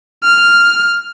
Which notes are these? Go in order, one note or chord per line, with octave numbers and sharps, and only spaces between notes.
F6